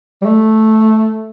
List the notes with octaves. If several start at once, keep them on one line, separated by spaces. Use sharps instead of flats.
G3
A3